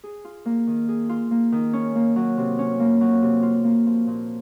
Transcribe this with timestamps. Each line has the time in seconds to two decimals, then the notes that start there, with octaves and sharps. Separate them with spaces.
0.04 G#4
0.25 F4
0.46 A#3
0.67 D#3
0.89 G#4
1.09 F4
1.31 A#3
1.52 D#3
1.73 C#4
1.95 A#3
2.16 F#3
2.37 C3
2.59 C#4
2.80 A#3
3.01 F#3
3.22 C3
3.43 F4
3.64 A#3
3.86 F3
4.07 A#2